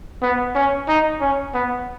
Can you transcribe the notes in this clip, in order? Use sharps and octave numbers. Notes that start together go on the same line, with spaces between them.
B3
C#4
D#4
C#4
B3